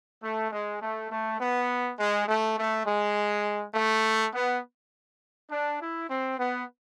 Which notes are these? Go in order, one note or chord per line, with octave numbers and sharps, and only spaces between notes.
A3
G#3
A3
A3
B3
G#3
A3
A3
G#3
A3
B3
D4
E4
C4
B3